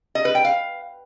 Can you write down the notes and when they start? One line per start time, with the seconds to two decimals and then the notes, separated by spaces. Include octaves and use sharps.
0.15 D#5
0.25 B4
0.35 G5
0.45 F5